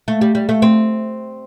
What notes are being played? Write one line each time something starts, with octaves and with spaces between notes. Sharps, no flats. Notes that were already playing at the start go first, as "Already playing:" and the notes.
A3
G3
G3
A3
C4